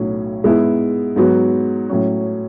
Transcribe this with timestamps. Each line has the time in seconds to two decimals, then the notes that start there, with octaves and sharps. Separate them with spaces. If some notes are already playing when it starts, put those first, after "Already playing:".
Already playing: B1 A2 F#3 C#4
0.44 G#2 G#3 B3 E4
1.16 G#2 F#3 B3 F#4
1.89 A2 F#3 C#4